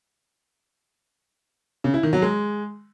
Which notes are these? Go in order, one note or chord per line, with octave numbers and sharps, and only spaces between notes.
C#3
E4
D#3
F#3
G#3